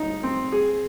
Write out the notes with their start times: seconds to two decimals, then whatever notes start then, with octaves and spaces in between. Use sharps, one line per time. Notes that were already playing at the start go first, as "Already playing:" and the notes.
Already playing: D#4
0.23 C4
0.52 G#4